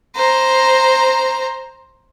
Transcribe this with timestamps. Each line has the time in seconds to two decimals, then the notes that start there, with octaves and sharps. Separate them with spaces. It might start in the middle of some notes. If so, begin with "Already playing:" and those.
0.16 C5 A#5